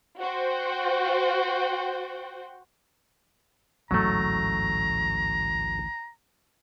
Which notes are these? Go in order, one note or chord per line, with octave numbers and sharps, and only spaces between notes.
F#4 C5 G5
A1 D2 G#2 F#3 A3 A#5